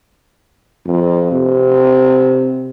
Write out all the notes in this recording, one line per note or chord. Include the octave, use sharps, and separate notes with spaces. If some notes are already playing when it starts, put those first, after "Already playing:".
F2
C3